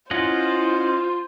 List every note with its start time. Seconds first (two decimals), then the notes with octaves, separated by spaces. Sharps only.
0.11 C#4 E4 F4 C5 D#5 F#5